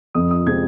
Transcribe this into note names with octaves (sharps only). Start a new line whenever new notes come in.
F2 D#6
D#6
C3 F3 G#3 C4 G#6